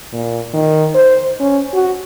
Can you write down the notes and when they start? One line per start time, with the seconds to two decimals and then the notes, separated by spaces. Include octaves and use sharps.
0.13 A#2
0.54 D#3
0.95 C5
1.40 C#4
1.74 F#4